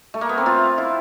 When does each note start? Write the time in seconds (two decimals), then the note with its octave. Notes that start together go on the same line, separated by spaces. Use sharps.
0.14 A3
0.21 A#3
0.29 B3
0.38 C4
0.46 F4
0.78 E4